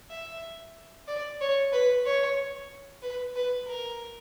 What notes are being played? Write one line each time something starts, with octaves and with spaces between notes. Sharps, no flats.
E5
D5
C#5
B4
C#5
B4
B4
A#4